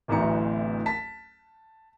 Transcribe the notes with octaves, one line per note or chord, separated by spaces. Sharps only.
D1 A1 D2 E3 A#5 C#7
A5 B6